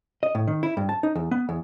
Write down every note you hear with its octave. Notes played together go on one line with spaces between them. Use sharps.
D#5
A2
D#3
E4
G2
A5
D#4
E2
B3
E2